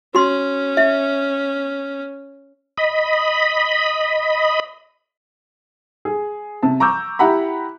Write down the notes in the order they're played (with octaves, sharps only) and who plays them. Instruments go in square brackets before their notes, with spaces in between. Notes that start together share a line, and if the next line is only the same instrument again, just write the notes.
[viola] C#4 [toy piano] F#4 C6
[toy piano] E5
[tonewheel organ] D#5 B5
[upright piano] G#4
C3 A5
A#5 C#6 D6 E6 G6
E4 G4 F#5 A#5 B5